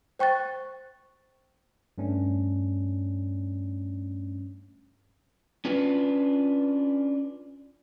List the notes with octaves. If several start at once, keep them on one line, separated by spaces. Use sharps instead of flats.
C5 G5 C#6 F#6 A6
G2 A3 C#4 D4
C#4 D4 F4 B4